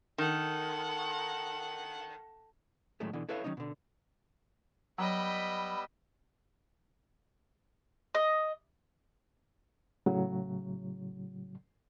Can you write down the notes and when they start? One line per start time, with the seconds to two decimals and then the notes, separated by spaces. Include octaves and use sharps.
0.18 D#3 A4 F#5
3.00 A2 D#3 F#3 G#3 A3
3.13 B2 D3 E3
3.29 E4 A4 B4 C#5 E5 F5
3.44 D#3 E3 F#3 C#4 D#4
3.57 B2 D3
4.98 F#3 G3 B3 D#5 G5 B5 E6
8.15 D#5
10.06 A2 C#3 F#3